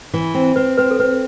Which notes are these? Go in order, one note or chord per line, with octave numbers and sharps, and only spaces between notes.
E3
C4
C4 B4
C4 B4
A4
C4 B4